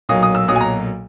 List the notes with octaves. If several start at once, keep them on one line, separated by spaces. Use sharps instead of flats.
B1 A#2 F#3 A#3 D#6
D#6
E6
B1 A#2 F#3 A#3 D#6
G#5
A#5